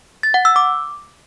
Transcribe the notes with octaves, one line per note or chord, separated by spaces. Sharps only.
A6
F#5
E6
D6